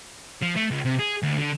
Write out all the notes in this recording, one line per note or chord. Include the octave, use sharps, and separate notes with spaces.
F3
A3
C#2
C3
G#4
D2
D3